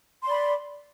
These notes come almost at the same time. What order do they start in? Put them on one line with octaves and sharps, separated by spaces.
C6 D5 B5